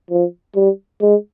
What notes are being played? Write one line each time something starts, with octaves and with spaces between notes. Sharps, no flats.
F3
G3
G#3